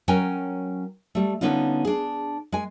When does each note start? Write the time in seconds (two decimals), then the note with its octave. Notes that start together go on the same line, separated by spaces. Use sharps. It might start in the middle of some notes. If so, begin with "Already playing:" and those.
0.08 F#3 C#4 A#4 G5 G#5
1.15 G3 A3
1.41 D3 B3 C#4 D#4 F4
1.85 D4 G#4
2.52 G#3 G#5